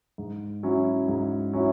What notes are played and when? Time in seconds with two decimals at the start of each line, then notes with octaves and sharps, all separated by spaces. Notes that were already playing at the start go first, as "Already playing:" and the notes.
0.18 G#2
0.63 F#3 C#4 E4
1.08 G#2
1.53 F#3 C#4 E4